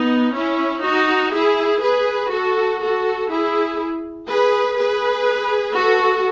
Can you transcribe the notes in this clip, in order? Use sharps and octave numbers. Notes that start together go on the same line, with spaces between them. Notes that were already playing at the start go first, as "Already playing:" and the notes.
Already playing: B3 D#4
C#4 E4
D#4 F#4
E4 G#4
G#4 B4
F#4 A4
F#4 A4
E4 G#4
G#4 B4
G#4 B4
F#4 A4